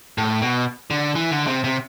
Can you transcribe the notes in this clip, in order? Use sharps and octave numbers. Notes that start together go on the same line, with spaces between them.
A2
B2
D3
E3
D3
C3
C3